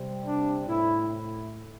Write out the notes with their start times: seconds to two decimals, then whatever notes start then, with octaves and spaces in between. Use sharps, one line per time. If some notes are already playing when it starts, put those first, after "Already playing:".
Already playing: C3 G3 C4
0.25 D4
0.67 A2 E4